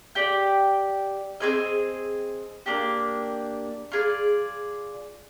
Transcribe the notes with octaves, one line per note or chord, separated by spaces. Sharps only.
G4 D5 G5
C4 D#4 G#4 D#5
A#3 D4 G4
F4 G#4 D5